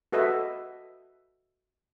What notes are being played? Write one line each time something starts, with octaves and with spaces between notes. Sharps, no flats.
F#4 A4 B4 D#5 E5